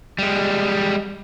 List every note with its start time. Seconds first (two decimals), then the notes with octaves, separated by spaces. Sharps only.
0.19 G3 G#3